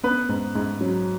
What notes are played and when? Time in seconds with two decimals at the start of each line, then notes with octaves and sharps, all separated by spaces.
0.04 B3 B4
0.29 G#2
0.55 G#2
0.81 F#3